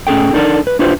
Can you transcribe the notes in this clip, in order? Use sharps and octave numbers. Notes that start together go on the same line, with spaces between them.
A2 C#4 G#4 A4 G5
D4 D#4 A4 A#4 D5
B4
D4 E4 F4 G4 B4 C5